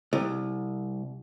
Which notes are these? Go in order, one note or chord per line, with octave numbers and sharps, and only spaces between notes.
C2